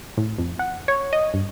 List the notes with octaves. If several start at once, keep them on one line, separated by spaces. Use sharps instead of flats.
A2
F2
F#5
C#5
D#5
G2